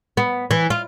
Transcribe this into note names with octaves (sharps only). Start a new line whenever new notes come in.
B3
E3
F4